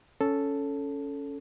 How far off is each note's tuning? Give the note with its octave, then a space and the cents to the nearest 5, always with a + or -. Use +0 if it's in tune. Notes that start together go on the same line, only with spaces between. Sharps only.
C#4 +10 A4 +0